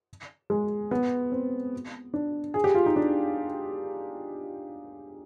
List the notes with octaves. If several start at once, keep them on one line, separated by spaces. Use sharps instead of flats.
G#3
B3
C4
D4
G#4
G4
F4
D#4
D4